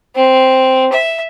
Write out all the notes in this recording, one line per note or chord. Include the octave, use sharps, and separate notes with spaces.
C4
E5